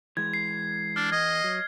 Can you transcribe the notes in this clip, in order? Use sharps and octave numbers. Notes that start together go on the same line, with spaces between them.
E3 G#3 G#6
C7
D4 F6
E2 D#5 G#6
F#3